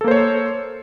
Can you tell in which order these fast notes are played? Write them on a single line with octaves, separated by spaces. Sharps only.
A4 A#3 C5 C#5